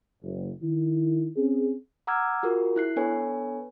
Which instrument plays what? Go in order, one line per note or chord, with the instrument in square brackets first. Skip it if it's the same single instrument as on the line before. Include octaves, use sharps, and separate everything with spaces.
[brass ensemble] F#1
D#3 E4
C4 C#4 G#4
[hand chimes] F#5 A#5 D6 E6 F6 G#6
F4 F#4 G#4 A#4
E4 F#6 C7
B3 D4 A4 B4 C#5 G#5